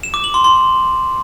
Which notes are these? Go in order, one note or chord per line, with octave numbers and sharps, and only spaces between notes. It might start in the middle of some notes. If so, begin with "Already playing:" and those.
E7
D6
F#7
C6
C6